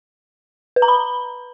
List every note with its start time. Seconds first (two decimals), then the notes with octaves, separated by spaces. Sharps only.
0.76 B4
0.82 A#5
0.88 B5